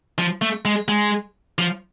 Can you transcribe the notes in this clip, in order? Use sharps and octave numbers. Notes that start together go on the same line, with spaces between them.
F3
A3
G#3
G#3
F3